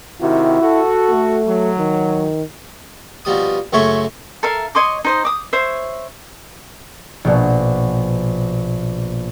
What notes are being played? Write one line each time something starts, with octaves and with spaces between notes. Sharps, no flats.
C3 D#3 E4 F#4
F#4 A4
A3
F#3
D#3
B2 F3 G3 D#6
F#2 C#3 A3 C#5 E5 C6
A4 A#4 E5 F5
C#5 D#5 C6 D6
D#4 C5 D#5
D6 D#6
C5 C#5 E5
A#1 B2